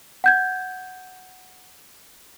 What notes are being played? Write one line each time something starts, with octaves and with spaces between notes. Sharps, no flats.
F#5 G6 G#6